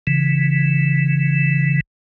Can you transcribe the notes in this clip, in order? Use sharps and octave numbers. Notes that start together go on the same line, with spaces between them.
C#3 E3